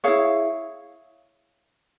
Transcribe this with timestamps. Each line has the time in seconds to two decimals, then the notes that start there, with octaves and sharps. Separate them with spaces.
0.04 E4 G#4 C#5 F5